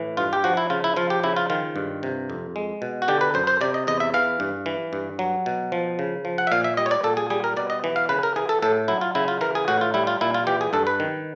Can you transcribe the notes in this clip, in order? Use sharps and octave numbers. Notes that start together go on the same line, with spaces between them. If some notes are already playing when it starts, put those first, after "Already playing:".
Already playing: A2 E3
G2 F4
G4
F3 F#4
E4
C#3 F4
E4
F3 F4
G4
C#3 E4
F4
D#3 F4
G2
C3
F2
G#3
B2
F#4
D3 G4
B4
F#2 C5
C5
C3 D5
D#5
E2 D#5
E5
E3 F5
G2
E3
G2
F#3
B2
F3
C#3
F3
F#5
E5
A#2 F5
E5
G3 D#5
C#5
D5
A#2 A4
G#4
G3 G#4
A#4
B2 D5
D#5
E3
F5
C#3 B4
A#4
E3 G#4
A4
A2 A4
F#3 E4
F4
C#3 E4
F4
E3 A#4
G#4
A2 F#4
F4
G3 E4
F4
A#2 E4
F4
E3 G4
G#4
G2 A4
B4
D#3